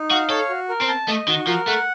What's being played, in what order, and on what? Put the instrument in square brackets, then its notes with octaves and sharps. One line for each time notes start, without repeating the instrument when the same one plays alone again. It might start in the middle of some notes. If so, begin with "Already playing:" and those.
Already playing: [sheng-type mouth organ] D#4
[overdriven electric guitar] F#4 [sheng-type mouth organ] F5
[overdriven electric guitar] A4 [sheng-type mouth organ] C#5
[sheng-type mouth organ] F#4
A#4
[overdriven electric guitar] C4
[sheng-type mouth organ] A5
[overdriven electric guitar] A3 [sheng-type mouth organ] D#5
[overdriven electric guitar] D#3 [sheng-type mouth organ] F#4
[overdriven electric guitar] F3 [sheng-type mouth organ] A#4
[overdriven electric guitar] A3 [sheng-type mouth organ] F#5